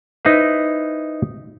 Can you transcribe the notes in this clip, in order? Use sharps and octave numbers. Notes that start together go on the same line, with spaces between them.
D#4 E4 B4 C5